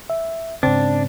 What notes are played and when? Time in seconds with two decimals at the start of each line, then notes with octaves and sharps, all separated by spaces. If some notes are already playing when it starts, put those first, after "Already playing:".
0.10 E5
0.63 G#2 C#3 C4 D4